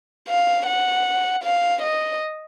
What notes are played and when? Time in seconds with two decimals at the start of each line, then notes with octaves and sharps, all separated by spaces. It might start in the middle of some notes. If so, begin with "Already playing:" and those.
0.28 F5
0.67 F#5
1.43 F5
1.82 D#5